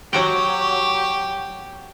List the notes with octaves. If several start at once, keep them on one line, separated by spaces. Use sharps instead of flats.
F#3 F#4 G4 G5